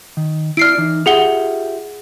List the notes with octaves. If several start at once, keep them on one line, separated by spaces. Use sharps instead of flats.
D#3
E4 D5 F6 C7 D7
E3 D#4
F4 G4 G#4 E5 F#5 G7